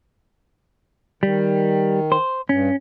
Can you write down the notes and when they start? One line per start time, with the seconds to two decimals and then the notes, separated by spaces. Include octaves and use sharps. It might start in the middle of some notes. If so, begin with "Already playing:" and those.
1.23 D#3 G3
2.12 C5
2.49 G2 C#4